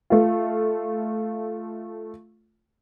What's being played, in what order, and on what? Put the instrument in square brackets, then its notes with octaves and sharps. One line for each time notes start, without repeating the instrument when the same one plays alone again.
[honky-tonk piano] A3 F4